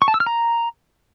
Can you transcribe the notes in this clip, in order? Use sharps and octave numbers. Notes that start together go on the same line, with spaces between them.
C#6
A5
E6
F6
A#5